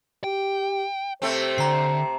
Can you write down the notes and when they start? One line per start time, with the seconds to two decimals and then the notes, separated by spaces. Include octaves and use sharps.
0.24 G4 G5
1.22 C3 A3 C4 C5
1.58 D3 A#5 C7